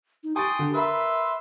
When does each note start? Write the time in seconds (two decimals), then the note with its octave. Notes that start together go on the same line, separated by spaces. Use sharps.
0.24 D#4
0.36 G4 G5 G#5 C6 C#6 D#6 A6
0.59 D3
0.74 A#4 B4 E5 B5 C6 E6